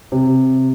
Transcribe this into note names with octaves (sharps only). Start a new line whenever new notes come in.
C3